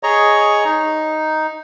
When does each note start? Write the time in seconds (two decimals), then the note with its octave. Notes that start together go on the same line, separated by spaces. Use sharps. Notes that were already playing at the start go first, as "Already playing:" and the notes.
0.03 G#4 C#5 D#5 A#5 C#6
0.65 D#4